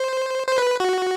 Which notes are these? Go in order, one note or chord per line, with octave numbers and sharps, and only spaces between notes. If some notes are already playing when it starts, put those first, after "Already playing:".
Already playing: C5
C5
B4
F#4